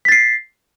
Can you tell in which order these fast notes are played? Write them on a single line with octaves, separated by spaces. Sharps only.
B6 A6 C7